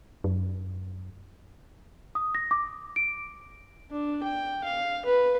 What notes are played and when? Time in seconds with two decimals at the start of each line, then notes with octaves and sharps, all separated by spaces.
0.24 F#2
2.15 D#6
2.35 A#6
2.51 D6
2.96 D7
3.91 D4
4.23 G5
4.64 F5
5.05 B4